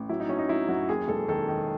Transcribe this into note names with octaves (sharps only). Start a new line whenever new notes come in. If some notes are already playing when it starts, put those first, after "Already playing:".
Already playing: A1
F#3 E4
D#4
F#3 C#4
D#4
F#3 E4
F#2 F#4
D#2 G#4
E1 A4
D#3 A4
D#3